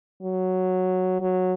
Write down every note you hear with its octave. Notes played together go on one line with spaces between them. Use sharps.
F#3
F#3